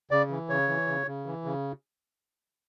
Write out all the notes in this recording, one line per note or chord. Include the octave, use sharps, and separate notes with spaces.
C#3 D5
E3
C#3 C#5
E3
C#3
C#3
E3
C#3